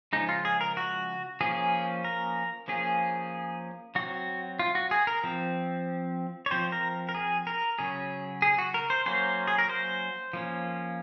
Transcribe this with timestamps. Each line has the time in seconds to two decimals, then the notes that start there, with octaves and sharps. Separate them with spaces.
0.13 C#3 F3 G#3 D#4
0.29 F4
0.45 G#4
0.61 A#4
0.77 F#4
1.41 F3 A#3 C#4 G#4
2.04 A#4
2.68 F3 A#3 C#4 G#4
3.95 F#3 C4 F#4
4.59 F4
4.75 F#4
4.91 G#4
5.07 A#4
5.24 F3 C4
6.46 C#5
6.51 F3 C4 C5
6.72 A#4
7.09 A#4
7.15 G#4
7.47 A#4
7.79 C#3 F#3 C#4 G#4
8.42 G#4
8.58 F#4
8.74 A#4
8.90 C5
9.06 F#3 A#3 C#4 C5
9.48 G#4
9.59 A#4
9.69 C5
10.33 F3 A#3 C#4